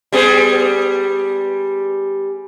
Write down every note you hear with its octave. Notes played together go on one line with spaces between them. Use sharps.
G3 B3 G#4